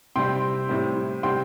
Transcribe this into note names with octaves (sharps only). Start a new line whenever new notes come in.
C3 G3 C4 G5 C6
A2 G3 C4
C3 G3 C4 G5 C6